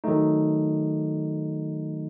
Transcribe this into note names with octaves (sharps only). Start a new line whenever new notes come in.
D#3 F#3 A3 D#4